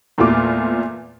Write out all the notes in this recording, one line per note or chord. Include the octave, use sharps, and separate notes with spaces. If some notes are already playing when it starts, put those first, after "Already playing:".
E2 A#2 A3 F4 D6